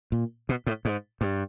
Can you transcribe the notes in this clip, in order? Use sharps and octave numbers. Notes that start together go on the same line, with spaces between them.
A#2
B2
A2
G#2
G2